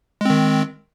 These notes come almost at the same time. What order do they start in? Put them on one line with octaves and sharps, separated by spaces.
G#3 C4 D#3